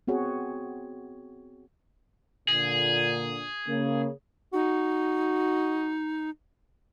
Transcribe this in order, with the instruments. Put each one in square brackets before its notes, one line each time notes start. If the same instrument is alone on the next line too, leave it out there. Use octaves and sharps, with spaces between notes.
[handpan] B3 C4 F#4 G#4 C#5
[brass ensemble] A#2 D3 [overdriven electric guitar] G#4
[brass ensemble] C#3 A#3
[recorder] D#4 [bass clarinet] F#4